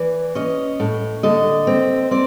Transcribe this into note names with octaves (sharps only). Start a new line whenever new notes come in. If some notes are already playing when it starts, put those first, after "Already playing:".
Already playing: E3 D5
C#4 D#5
A2
D3 D#5
C4
C4 D5